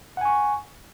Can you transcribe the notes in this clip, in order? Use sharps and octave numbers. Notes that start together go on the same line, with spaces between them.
F#5 G#5 C#6